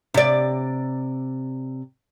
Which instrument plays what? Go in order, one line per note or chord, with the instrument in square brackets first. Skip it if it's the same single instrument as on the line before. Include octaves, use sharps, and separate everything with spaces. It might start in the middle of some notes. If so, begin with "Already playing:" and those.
[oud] C3 D5